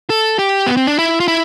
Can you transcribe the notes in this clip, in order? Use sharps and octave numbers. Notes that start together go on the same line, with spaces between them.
A4
G4
B3
C4
D4
E4
F4
E4